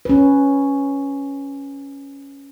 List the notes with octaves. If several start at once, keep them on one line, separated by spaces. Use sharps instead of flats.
C#4 B4